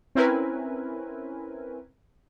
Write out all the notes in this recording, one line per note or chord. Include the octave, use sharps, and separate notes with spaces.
C4 C#4 E4 A#4 B4 G#5